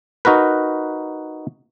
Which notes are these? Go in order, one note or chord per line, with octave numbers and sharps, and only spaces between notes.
D#4 F#4 A#4 B4